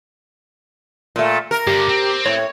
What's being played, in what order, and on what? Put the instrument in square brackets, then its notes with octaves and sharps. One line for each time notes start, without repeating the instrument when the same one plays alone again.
[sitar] A#2 A3
A#4
[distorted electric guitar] G2 D3 [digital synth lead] G4
[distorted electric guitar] C4
[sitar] A2 [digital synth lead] C#5